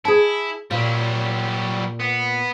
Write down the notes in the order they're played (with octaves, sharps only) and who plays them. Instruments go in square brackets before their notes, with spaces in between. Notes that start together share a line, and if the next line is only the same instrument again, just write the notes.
[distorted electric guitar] E4 [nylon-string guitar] G#4 A5
[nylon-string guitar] A#2 [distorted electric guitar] F#3 G3
[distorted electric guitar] B3